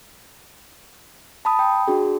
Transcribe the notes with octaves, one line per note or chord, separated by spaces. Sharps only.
A5 B5 D#6
G5
D4 F#4 G#4